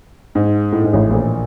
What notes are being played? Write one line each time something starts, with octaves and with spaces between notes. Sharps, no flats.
G#2
A2
G#2
A1 A2
A#1 A#2